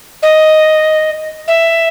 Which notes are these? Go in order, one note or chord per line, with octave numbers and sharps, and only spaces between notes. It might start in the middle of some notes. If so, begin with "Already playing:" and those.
D#5
E5